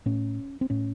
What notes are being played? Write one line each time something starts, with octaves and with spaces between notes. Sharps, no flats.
A2 C#4
C4
A2 C#4